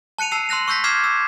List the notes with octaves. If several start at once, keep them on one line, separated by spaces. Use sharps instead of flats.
A5 F#6 C#7 D#7 F7
A5 E6 C7 F7
C6 E6 F#6 A#6 F7
C#6 E6 G6 A#6 B6
D6 E6 F6 G#6 C7 E7
E6